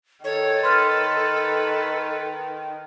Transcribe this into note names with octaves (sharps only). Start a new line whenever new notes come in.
D#3 A4 C#5
B4 C6 F6 A6